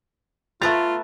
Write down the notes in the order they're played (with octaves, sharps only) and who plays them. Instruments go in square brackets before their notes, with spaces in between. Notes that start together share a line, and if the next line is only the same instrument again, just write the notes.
[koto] A3 B3 A#5 [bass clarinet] F4 [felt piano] A6